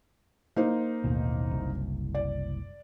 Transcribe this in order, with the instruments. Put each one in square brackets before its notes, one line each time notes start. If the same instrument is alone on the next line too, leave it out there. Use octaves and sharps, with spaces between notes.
[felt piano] A#3 D#4 C5
[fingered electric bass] A1 D#2 B2
F#1 C2
[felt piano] D5